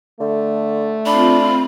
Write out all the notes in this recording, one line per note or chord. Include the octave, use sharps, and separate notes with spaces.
D3 A3
C4 D4 F4 B5